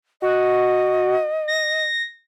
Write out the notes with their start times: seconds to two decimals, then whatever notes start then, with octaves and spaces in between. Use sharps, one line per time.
0.22 F#4 D#5
1.48 A#6